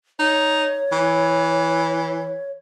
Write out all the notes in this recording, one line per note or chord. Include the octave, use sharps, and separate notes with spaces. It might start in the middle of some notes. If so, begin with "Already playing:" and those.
D#4 C#5
E3